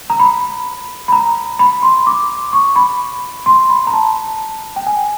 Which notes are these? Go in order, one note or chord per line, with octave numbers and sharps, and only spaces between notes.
A#5
B5
B5
A#5
B5
C6
D6
C#6
B5
C6
B5
A#5
A5
G5
G#5